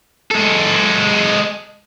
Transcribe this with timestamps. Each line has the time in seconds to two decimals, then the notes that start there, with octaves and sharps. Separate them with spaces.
0.31 G#3 A4